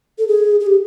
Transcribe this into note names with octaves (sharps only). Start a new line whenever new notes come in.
A4
G#4
G#4
G4